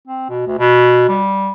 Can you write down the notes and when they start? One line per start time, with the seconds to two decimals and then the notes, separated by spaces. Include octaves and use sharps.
0.08 C4
0.29 B2
0.47 D2
0.59 B2
1.09 G3